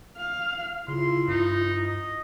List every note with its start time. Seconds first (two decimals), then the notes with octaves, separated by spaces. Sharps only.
0.17 F5
0.88 C#3 E4 F4 C6
1.28 G2 D#4
1.87 D#5